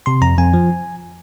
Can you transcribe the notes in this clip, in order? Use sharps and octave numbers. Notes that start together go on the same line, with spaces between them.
C3 C6
F2 A#5
F2 G#5
F3